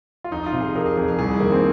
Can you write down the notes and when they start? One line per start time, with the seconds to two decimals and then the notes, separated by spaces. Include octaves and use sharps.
0.24 F4
0.32 F2 D#4
0.46 F4
0.53 C3
0.60 G#4
0.75 F2 A#4
0.86 G#4
0.97 F2 G#4
1.08 G#4
1.19 C2 G#4
1.40 D#3 A#3
1.52 C4